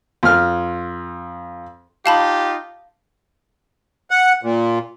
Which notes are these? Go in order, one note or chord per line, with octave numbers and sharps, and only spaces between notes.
F2 F6
D#4 F4 G4 F5 A5 B5
F#5
A#2